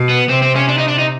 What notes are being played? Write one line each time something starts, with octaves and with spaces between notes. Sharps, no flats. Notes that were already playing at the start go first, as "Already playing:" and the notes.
Already playing: B2
B3
C3 C4
C4
C#4
D4
D#4
D4
D#4